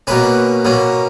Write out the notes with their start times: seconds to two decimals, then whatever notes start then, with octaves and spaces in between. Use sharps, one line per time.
0.07 B2 A#3 C#4 B4
0.65 B2 A#3 C#4